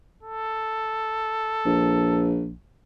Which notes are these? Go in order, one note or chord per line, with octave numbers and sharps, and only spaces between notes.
A4
A#1